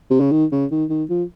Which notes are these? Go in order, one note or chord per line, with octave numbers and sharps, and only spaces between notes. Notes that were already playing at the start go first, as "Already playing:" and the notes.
C3
C#3
D#3
C#3
D#3
D#3
F3